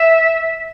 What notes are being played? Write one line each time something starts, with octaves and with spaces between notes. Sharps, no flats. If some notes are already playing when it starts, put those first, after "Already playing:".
Already playing: E5